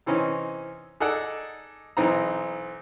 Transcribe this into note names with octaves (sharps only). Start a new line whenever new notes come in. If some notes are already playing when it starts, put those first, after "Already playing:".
C3 E3 C4 C#4 D#4
D#4 G#4 A4 D5 F#5
B1 E3 C4 D#4 A#5